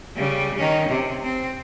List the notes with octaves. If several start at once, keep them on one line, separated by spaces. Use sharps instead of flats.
C#3 G3
D#3 C#4
C3
C4